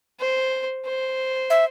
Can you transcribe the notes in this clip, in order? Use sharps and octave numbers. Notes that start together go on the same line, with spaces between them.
C5
C5
E5